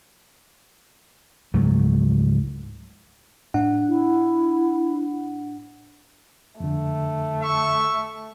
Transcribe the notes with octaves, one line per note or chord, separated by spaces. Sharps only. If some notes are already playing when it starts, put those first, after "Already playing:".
C#2 G#2 F#3 A3
A2 D4 F#5
E4
F2 D3 A3
A4 E5 C#6